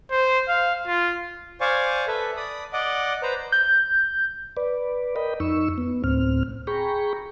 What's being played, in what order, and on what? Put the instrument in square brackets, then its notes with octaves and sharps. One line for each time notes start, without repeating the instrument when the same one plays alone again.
[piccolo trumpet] C5
F5
F4
[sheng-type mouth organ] C5 D5 F5 G#5 C#6
A4 B4 E5
D5 B5 D#6
D5 D#5 F#5 D6
B4 C5 A#5
[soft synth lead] G6
[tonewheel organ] B4 D5
A#4 D#5 G5 B5
F2 D#4 C#6 E6
B3
D2 A2 C4 F6
G#4 G5 A#5 B5 C#6